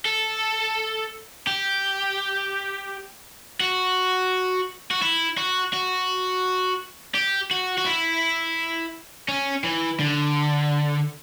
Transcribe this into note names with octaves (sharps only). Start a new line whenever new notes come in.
A4
G4
F#4
F#4
E4
F#4
F#4
G4
F#4
F#4
E4
C#4
E3
D3